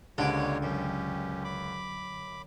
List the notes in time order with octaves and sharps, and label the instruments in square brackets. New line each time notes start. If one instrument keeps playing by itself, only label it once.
[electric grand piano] C#2 [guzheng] D3 [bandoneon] G#3 A#3 C#5 [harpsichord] G4 B4 D5
[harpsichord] F#2 [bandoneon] C#4 G4
[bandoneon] B5 D6